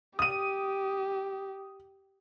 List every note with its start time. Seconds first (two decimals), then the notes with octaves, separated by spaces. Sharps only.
0.19 G4 D#6 D#7